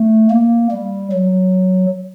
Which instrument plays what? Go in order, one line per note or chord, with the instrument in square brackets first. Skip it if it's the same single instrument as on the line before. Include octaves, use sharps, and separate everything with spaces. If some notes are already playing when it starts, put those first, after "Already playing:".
Already playing: [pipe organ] A3
A#3
G3
F#3